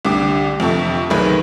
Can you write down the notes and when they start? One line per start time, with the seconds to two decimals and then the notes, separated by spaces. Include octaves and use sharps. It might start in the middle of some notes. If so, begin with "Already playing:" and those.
0.05 C2 D3 G4 D6
0.60 F2 C3 A4 C#6
1.10 B1 D#3 F#3 G#4 B4